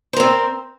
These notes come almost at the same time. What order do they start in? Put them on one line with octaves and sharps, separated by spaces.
C5 A#4 C4